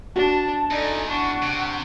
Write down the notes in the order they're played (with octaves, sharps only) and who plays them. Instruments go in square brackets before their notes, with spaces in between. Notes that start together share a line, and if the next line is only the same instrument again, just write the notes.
[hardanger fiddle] D4 [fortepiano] F#4 [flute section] A5
[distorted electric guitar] E2 [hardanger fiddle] D#4 [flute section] A4 D5 G#5
[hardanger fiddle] D4 [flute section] F#5 C#6
[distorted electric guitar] C3